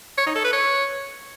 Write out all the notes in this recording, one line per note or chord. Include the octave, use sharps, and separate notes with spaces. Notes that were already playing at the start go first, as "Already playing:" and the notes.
C#5
D#4
A4
B4
C#5